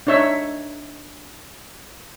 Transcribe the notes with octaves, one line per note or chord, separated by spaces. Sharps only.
D4 D#4 C#5 E5 E6